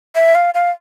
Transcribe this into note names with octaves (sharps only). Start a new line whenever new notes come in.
E5
F5
F5